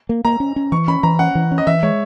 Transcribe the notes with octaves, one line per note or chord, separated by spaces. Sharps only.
A#3
A#3 A#5
C#4
C#4
E3 C#6
C#4 B5
E3 A#5
C#4 F#5
E3
C#4
D#5
E3 E5
G#3 C#5